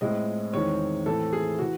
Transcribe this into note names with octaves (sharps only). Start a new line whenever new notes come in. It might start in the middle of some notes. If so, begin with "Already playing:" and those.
A2 G#3 C4 D#5
E2 D#3 G#3 C4 C#5
A2 E3 A3 C4 A4
G#4
E3 F#4